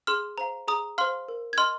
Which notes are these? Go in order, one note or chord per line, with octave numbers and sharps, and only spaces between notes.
G#4 C6 F6
C5 F5 A#5
G#4 A#5 D#6
C5 F5 C6 F6
A#4
G#6
D#5 C6 F6